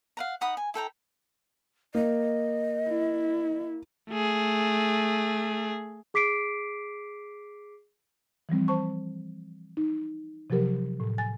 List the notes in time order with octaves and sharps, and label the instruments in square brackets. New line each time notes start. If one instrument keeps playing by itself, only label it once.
[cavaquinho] F5 F#5 A#5
D#4 F#5 B5 D#6
G#5
E4 A4 G5 A#5
[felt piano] A#3 [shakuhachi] D#5
[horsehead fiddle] E4
[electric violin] A3 G#4
[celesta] G#4 D6 B6 C7 D7
[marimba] E3 F3 G3 C4
C5 A5 C#6
D#4
C3 F3 F#3 G4 A#4
A2
G#5 A6